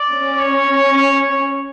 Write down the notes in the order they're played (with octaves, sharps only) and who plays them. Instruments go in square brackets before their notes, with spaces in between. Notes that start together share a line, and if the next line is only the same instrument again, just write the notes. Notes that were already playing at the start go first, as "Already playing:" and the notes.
Already playing: [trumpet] D5
[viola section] C#4
[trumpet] C#5